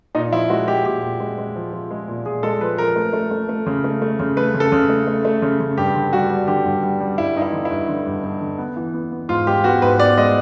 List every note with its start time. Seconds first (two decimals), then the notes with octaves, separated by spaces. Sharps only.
0.15 A#2 D#4
0.32 F3 E4
0.50 G#3 F#4
0.67 G#3 G4
0.85 A#2 G4
1.02 A#2
1.20 G#3
1.38 G#3
1.56 F3
1.73 F3
1.91 G#3
2.08 A#2
2.26 A#2 G#4
2.43 G#3 A4
2.61 F3 B4
2.78 F3 A#4
2.96 A3
3.13 A3
3.31 A3
3.49 A3
3.66 C#3
3.84 A3
4.02 A3
4.20 C#3
4.37 A3 B4
4.54 C#3
4.60 A4
4.72 C#3
4.89 A3
5.07 A3
5.25 A3
5.42 C#3
5.60 C#3
5.77 G2 G4
5.95 D3
6.13 G3 F#4
6.30 G3
6.48 D3 G4
6.65 G2
6.83 G3
7.00 G3
7.18 G2 E4
7.36 G2 D#4
7.42 E4
7.53 D3
7.65 E4
7.71 G2
7.89 D3
8.06 G2
8.23 G2
8.41 D3
8.58 B3
8.77 E3
8.94 B3
9.12 B3
9.29 G#2 F4
9.47 G#3 G4
9.64 B3 F#4
9.82 G#2 B4
9.99 B3 D5
10.17 G#3 D#5